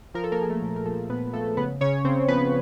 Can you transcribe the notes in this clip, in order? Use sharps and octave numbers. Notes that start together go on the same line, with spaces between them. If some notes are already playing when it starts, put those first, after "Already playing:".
F3 A#4
A4
A#3 A#4
F3 G#4
A3 A4
A#2
A#4
F3 A3 A4
A#2 B3 B4
F3 A3 A4
C#3 B3 B4
C#3 C#4 C#5
C#3 C4 C5
F3 B3 B4